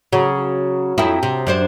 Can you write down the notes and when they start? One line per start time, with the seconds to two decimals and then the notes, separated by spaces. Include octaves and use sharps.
0.13 C#3 F#3
0.98 F2 E4 G5 A#5 D#6
1.23 C3
1.47 F#2 D4 C5